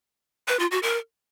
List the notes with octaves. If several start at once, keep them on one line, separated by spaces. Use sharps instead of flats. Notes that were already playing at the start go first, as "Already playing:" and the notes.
B4
F4
F#4
A#4